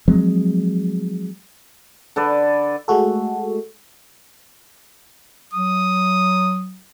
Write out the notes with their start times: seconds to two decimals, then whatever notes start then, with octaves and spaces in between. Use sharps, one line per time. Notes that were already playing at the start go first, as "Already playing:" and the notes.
0.08 F3 F#3 G#3 C4
2.16 D3 A4 B4 D5
2.88 G#3 A3 F#4 A4
5.54 F#3 D#6